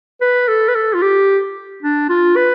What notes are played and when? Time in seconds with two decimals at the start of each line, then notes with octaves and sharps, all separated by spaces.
0.21 B4
0.48 A4
0.68 B4
0.75 A4
0.94 F4
1.02 G4
1.83 D4
2.09 F4
2.36 B4